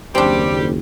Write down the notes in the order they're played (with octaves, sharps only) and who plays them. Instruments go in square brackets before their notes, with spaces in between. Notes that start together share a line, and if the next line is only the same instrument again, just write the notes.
[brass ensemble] F#1 D#2 [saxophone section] G3 G4 [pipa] C4 D4